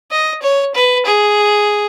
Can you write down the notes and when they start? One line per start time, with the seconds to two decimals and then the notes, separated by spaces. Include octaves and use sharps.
0.11 D#5
0.42 C#5
0.74 B4
1.06 G#4